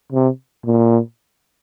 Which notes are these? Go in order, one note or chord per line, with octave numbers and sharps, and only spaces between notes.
C3
A#2